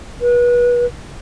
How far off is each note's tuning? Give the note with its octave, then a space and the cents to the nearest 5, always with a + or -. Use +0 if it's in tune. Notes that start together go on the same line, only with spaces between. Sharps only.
B4 -30